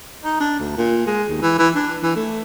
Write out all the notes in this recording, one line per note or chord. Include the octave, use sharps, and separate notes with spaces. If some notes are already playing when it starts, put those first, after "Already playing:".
D#4
D4
D2
A#2
G#3
D#2
E3
E3
D4
E3
A3